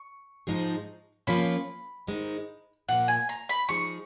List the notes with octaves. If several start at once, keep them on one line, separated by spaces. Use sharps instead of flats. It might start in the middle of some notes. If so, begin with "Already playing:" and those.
Already playing: C#6
G#2 F3 G#3 D#4 G#4
F3 A#3 C#4 F4 B5
G#2 D#3 G#3 D#4
A#2 F3 A#3 F4 F#5
G#5
A#5
B5
F3 G#3 D#4 G#4 C#6